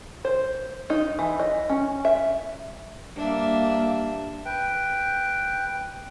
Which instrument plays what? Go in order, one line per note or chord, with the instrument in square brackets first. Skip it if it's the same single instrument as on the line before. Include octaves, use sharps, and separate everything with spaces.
[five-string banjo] C5
D#4
E3
D#5
C#4
E5
[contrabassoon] G2 [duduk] A#3 [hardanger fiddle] D4 E5
[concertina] B4 G5